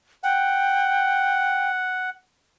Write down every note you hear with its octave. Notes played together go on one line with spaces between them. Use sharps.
F#5 G5